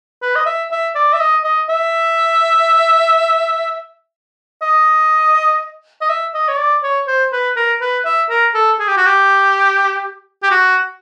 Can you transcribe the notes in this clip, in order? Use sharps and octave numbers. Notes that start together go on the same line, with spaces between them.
B4
D#5
E5
E5
D5
E5
D#5
D#5
E5
D#5
D#5
E5
D#5
C#5
D5
C#5
C5
B4
A#4
B4
E5
A#4
A4
G#4
G4
F#4
G4
G4
F#4